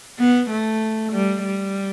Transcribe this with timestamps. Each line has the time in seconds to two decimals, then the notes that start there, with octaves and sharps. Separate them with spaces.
0.19 B3
0.50 A3
1.13 G3
1.44 G3